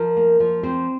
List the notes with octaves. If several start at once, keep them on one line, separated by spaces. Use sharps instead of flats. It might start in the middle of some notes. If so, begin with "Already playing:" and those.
Already playing: F3 A#4
A#3
F3
C4 C5